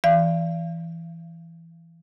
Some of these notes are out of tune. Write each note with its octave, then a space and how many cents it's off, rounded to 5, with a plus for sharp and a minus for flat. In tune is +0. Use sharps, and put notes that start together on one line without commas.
E3 +10 D5 +0 F5 -35